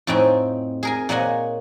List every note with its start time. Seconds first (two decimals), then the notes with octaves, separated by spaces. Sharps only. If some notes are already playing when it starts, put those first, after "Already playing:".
0.07 F2 A2 C4 D#4 G5 G#5
0.83 G#4 A#4 G#5
1.09 A#2 A#3 C#5 D#5 F#5 G#5